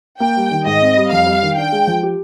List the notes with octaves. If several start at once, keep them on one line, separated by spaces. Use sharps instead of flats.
A#3 G5
G3
D#3
G#2 D#5
C4
G3
F2 F5
G3
D#3
D4 G5
G#3
F3
G4